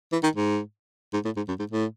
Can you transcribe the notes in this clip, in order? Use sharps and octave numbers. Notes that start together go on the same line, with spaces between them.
E3
D#3
G#2
G#2
A2
G#2
F#2
G#2
A2